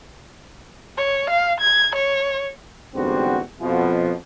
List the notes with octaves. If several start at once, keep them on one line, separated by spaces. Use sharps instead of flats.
C#5
F5
G#6
C#5
E2 G#2 D3 G3 C4 F#4
F2 B2 F3